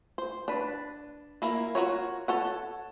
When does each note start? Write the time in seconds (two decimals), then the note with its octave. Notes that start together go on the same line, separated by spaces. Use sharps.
0.18 C5
0.48 D4 B4
1.42 A#3 E4 A#4
1.75 F4 F#4 A#4 C#5
2.28 A4 C#5 F#5